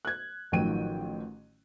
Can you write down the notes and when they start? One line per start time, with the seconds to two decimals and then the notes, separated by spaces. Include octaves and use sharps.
0.05 F#6 G#6
0.52 A1 D#3 F3 F#3 G5 D#7